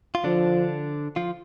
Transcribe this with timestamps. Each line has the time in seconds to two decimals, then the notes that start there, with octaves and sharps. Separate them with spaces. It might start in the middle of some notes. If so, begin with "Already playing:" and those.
0.15 F4
0.24 D3 F3 D4
1.16 F3 F4